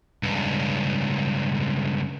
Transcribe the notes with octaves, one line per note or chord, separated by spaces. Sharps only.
C#2 G2